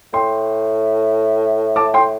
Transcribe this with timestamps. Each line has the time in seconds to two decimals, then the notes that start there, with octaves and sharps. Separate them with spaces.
0.13 A2 G5 C6
1.76 A5 D6
1.94 G5 C6